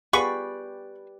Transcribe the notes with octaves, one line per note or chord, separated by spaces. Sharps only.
B3 F4 G4 G#4 B4 D5 B5 C#6